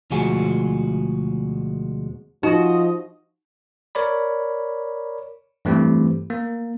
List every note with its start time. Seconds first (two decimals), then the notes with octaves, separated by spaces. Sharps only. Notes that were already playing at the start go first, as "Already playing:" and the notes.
0.10 D2 B2 F3 G#3 F#4 G#5
2.43 F3 D#4 F#4 D#5
3.95 A#4 C#5 D5 B5
5.65 G2 E3 A3 C4 E4 G4
6.30 A#3